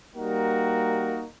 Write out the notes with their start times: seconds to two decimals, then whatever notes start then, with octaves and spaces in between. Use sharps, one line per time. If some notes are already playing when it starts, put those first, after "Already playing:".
0.15 G3 A#3 D#4 F#4 A#4